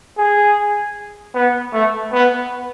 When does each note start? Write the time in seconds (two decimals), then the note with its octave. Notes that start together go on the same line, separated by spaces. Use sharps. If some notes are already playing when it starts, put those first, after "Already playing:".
0.18 G#4
1.35 B3
1.73 A3
2.13 B3